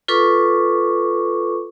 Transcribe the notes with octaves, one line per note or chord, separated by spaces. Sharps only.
F4 A4 B4 C#6 D6